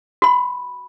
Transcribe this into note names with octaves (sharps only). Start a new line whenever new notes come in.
F#4 B5